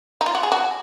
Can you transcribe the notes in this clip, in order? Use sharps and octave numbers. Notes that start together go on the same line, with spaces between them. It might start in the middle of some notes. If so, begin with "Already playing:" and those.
D#4
F4
F#4
G#4
F#4